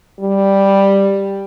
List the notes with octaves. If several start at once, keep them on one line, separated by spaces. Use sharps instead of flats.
G3